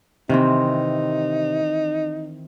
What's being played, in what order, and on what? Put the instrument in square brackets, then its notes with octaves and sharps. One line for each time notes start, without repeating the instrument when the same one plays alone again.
[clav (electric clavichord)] C3 [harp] D#3 E3 C4 [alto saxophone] D#4